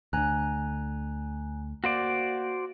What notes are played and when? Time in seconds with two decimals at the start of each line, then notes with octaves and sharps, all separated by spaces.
0.13 D2 D3 G#5 A#5 F#6
1.84 A#3 F#4 C5 D5